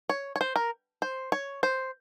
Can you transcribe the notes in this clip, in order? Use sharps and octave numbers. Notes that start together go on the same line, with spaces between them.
C#5
C#5
C5
A#4
C5
C#5
C5